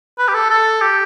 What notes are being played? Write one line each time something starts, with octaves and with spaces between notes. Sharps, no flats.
B4
G4
A4
A4
G4